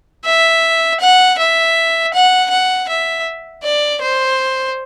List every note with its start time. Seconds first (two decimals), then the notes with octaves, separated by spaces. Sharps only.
0.25 E5
1.00 F#5
1.38 E5
2.14 F#5
2.50 F#5
2.88 E5
3.63 D5
4.02 C5